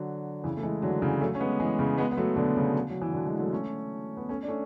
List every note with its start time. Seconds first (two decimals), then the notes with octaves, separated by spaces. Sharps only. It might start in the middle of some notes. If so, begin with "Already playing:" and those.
Already playing: D3 F#3
0.44 C#3 E3
0.57 A3
0.63 E3 G#3
0.82 D3 F#3
1.02 C#3 E3
1.21 F#3 A3
1.35 C#4
1.41 G#3 B3
1.60 E3 G#3
1.79 C#3
1.98 G#3 B3
2.12 B3
2.18 F#3 A3
2.36 B2 D3
2.56 C#3
2.90 F#3
3.01 E3
3.13 B2 D3
3.26 E3 G#3
3.39 F#3 A3
3.52 A3 C#4
4.17 B3
4.29 A3 C#4
4.43 D4
4.48 A3 C#4